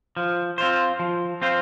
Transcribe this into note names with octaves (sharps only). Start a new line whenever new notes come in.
F3
C4 F4 C5
F3
C4 F4 C5